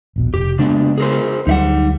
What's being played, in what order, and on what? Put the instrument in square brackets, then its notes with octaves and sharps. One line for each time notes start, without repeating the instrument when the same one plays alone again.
[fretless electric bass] D#1 A#1 B2
[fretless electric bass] F1 [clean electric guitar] G4
[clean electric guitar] D#2 D4 [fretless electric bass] C#3 G#3 B3
[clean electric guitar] G#4 A#4 C5
[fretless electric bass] D2 F#3 G3 [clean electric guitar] D#4 E5 F#5